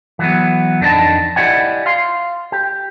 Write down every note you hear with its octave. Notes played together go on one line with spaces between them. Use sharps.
E3 F#3 B3
F2 D#3 D4 D#5 A5
E4 G4 D5 D#5 F#5 G#5
F5 C6
G4